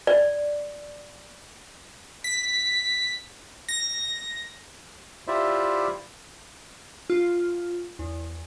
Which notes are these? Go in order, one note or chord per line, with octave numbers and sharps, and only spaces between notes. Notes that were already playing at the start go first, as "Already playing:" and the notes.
D5
B6
A#6
E4 F4 G4 C5 D5 E5
F4
E2